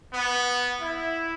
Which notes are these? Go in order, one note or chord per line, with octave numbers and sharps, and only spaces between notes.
B3
E4